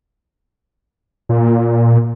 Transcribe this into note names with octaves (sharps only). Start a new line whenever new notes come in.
A#2